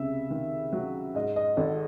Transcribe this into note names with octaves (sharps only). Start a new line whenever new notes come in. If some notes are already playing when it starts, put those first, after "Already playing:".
Already playing: C#2 C3 E5
D#3
F#3
G#2 D#5
D#5
G#1 A4